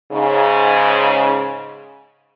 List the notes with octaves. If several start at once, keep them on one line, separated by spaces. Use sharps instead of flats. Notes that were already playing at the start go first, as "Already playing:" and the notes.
G#2 C#3